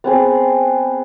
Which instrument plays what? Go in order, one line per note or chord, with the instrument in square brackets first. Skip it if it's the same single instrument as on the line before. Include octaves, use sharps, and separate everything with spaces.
[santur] B3 C4 G#4